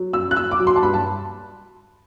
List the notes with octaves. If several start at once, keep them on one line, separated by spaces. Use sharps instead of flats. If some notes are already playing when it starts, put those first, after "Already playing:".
Already playing: F#3
F#2 E6
F#6
F#2 E6
D6
F#3
C6
A5
G2 B5
A5